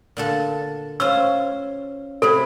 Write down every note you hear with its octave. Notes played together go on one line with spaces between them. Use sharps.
A#2 D3 A4
C#4 F4 C5 E6
C3 E4 G#4 A4